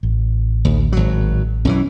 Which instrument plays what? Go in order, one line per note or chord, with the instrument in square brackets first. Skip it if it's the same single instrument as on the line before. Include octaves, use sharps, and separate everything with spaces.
[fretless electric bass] A1
[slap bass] D2
G#1 F#3
[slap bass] B1 F#2 E3 [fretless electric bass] C#4